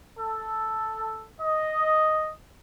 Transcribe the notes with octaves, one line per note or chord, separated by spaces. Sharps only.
A4
D#5